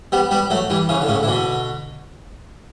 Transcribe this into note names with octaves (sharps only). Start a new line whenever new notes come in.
G3 B3
G3 B3
F#3 A3
E3 G3
C#3 E3
D3
A2 C#3
E3
B2 D3